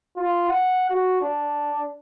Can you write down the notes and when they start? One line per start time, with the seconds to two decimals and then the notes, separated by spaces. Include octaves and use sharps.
0.17 F4
0.49 F#5
0.90 F#4
1.22 D4